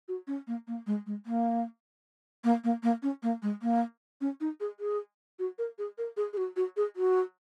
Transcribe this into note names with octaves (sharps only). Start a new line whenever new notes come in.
F#4
C#4
A#3
A#3
G#3
G#3
A#3
A#3
A#3
A#3
C#4
A#3
G#3
A#3
C#4
D#4
G#4
G#4
F#4
A#4
G#4
A#4
G#4
G#4
F#4
F#4
G#4
F#4